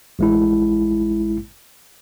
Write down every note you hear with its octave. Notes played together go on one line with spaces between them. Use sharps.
A1 G#3 E4